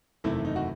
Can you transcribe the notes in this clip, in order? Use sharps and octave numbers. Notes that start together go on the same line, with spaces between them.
F#1 E2 C3 D#3 A3 E4
D#4
F#4